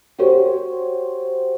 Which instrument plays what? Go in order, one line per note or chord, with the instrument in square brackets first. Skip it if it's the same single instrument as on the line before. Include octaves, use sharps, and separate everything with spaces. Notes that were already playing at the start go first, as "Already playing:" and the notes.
[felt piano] F#4 G4 C5 C#5